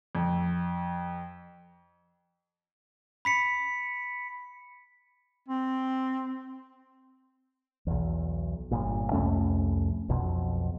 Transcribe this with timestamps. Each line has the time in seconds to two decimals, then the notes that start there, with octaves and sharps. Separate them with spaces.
0.15 F2
3.25 B5 B6 C#7
5.48 C4
7.87 B1 E2
8.71 G1 A#2
9.12 C2 F2 A3 C#4
10.10 B1 F2 B2